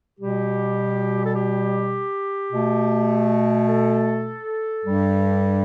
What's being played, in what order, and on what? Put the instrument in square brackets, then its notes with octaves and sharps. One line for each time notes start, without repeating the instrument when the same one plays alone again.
[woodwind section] B2 G3 G4
A4
G4
B2 A3
A4
G2 G3